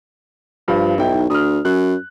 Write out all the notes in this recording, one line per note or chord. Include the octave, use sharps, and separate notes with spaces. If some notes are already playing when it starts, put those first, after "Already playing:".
G2 F3
B1 D#4 E4 G5
D2 D#6 F6
F#2 F#6